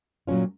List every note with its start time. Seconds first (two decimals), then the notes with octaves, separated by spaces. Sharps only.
0.27 A#2 F#3 C#4 F4